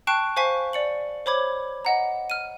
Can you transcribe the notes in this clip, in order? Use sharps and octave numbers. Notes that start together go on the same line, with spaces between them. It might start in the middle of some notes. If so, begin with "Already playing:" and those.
G5 A5 C#6 F#6 C7 D7
C5 F5 G#5 C#6 B6
D5 C#7 F#7
C5 C#5 B5 D6 G#6
D#5 F#5 A#5
F6 D#7